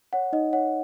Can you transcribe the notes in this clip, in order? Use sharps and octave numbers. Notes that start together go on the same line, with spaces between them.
C#5 F#5
D#4 D#5
C#5 F#5